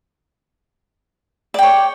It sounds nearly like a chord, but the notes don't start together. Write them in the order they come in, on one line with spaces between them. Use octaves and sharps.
D5 G5 C#5